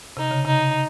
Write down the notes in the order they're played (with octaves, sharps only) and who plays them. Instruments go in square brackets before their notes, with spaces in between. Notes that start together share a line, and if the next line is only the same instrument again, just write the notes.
[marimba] C3 [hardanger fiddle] D#4
[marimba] C#3
[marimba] C3 [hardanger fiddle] D#4